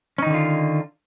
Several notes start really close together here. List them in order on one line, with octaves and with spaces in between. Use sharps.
C#4 D#4 D#3 D3 F4